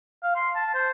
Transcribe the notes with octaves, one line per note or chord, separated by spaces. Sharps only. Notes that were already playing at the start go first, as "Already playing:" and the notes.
F5
C6
A5
C5